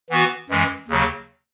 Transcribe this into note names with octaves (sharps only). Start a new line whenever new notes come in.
E3 B3 F#4 B4
F#2 E3 G#3
D#2 C#3 F#3